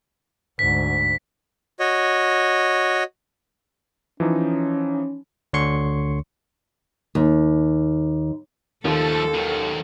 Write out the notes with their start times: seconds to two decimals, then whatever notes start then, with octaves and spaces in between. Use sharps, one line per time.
0.59 D2 G#2 B6
1.80 F#4 C#5 D#5
4.20 E3 F3 C#4 D#4
5.53 D2 D3 C#5 C6 C#6 C#7
7.15 D#2
8.85 D#2 F3 A3 A4
9.34 D#3 F#3